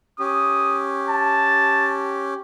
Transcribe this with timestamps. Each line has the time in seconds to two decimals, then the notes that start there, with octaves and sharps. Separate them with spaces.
0.20 C#4 G4 D#6
1.09 A5